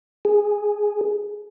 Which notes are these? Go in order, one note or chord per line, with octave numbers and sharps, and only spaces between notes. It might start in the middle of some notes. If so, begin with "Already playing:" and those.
G#4